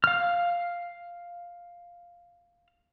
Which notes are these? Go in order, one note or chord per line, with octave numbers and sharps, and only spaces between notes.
F5 F6